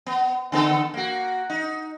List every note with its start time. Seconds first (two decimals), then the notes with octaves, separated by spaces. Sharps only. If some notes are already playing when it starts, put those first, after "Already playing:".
0.06 B3
0.52 D3 B3 A4
0.94 A#3 F#4
1.50 D#4